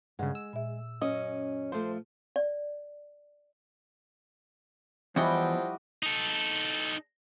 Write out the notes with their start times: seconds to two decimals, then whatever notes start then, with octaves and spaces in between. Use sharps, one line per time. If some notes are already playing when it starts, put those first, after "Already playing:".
0.19 G2 C#3 G#3 F#5
0.35 E6
0.53 A#2 E5
1.01 F#2 C#4 D#5
1.72 F3 A3 C5
2.36 D5
5.16 E2 F3 G3 E4 F#4 D#5 G5
6.03 D#4 A4